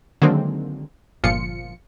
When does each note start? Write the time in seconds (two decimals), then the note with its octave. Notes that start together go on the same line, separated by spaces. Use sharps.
0.22 D3 D#3 F#3 G#3 A#3 C4
1.24 G1 A#2 F3 F4 C#7